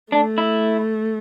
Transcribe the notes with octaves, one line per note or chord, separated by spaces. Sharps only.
A3 D4
E4